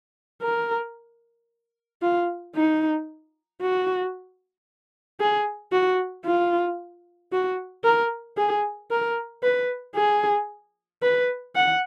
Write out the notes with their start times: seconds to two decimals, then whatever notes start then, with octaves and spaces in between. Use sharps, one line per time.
0.42 A#4
2.02 F4
2.55 D#4
3.61 F#4
5.20 G#4
5.72 F#4
6.26 F4
7.32 F#4
7.84 A#4
8.37 G#4
8.91 A#4
9.43 B4
9.96 G#4
11.03 B4
11.55 F#5